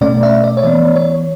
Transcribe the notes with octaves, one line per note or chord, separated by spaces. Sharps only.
B2 A3 C#4 D5
E5
D5
C#5
E3 B3 D5
C#5